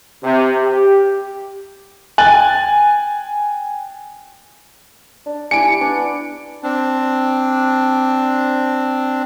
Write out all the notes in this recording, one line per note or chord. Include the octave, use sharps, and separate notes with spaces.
C3
G4
G5 G#5 F#6 A6 F#7
D4
G3 D4 E4 G#5 C#7 D7
B3 D4
C4 D4